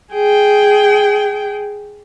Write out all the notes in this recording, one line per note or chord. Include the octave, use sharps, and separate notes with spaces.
G#4 G5